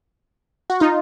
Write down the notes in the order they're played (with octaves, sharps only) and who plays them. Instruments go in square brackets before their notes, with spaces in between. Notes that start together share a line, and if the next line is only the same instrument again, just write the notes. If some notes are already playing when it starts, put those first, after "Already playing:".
[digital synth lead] F#4
[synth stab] D#4 [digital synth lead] F4